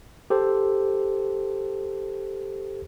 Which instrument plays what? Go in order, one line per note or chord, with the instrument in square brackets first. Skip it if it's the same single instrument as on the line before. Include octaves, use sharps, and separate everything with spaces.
[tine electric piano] G4 A4 C5